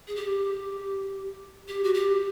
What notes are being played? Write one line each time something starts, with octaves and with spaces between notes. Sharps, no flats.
G#4
G4
G4
F#4
G4